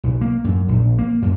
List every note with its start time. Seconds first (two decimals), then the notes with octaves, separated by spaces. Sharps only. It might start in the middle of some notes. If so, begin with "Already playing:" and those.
0.04 B1
0.21 A#3
0.44 F#2
0.68 A#1
0.98 A#3
1.22 F#2